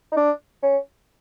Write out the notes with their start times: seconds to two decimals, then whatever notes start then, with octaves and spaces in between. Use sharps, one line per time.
0.12 D#4
0.17 D4
0.63 C#4